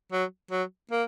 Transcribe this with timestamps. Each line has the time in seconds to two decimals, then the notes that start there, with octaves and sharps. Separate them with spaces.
0.13 F#3
0.51 F#3
0.92 A#3